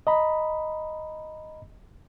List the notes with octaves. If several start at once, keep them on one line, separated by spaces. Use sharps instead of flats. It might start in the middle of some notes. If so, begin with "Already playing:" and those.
D#5 A#5 B5